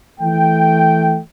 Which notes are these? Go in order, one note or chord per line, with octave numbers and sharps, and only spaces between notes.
E3 A3 G5